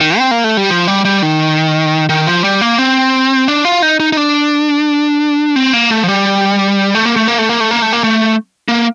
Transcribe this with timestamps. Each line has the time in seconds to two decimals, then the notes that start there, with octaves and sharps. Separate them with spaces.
0.01 D#3
0.18 C4
0.31 A#3
0.44 A3
0.57 G3
0.70 F3
0.87 G3
1.05 G3
1.22 D#3
2.09 D#3
2.27 F3
2.44 G3
2.61 A#3
2.78 C4
3.48 D4
3.65 F4
3.82 D#4
4.00 D#4
4.13 D#4
4.17 D4
5.56 C4
5.73 A#3
5.91 A3
6.04 F3
6.08 G3
6.95 A3
7.06 A#3
7.16 A3
7.28 A#3
7.38 A3
7.49 A#3
7.60 A3
7.71 A#3
7.82 A3
7.93 A#3
8.04 A3
8.68 A#3